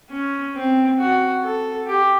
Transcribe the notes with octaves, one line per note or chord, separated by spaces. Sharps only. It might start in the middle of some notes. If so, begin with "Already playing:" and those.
C#4
C4
F#4
A4
G4